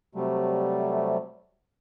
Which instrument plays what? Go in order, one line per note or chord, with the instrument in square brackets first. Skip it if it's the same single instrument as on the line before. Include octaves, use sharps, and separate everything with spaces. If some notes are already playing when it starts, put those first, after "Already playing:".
[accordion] C3 F#3 G3 A3